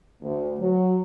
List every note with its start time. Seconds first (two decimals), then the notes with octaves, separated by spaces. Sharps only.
0.22 D2
0.59 F#3